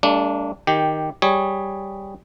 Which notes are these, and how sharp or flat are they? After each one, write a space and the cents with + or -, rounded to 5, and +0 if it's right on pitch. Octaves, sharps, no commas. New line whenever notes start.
G3 +40 A#3 -45 D4 -20
D#3 +0 G4 +0
G3 +0 G#4 +0 C#5 +0